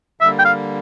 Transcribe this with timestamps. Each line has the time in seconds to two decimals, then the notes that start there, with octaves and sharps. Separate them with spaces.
0.21 D3 G3 A#3 E5
0.39 G5
0.45 F5